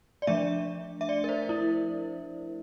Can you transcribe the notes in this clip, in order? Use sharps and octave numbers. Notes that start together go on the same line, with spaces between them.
D5
F3 A3 D4 E5
E5
D5
A#4
C5
E4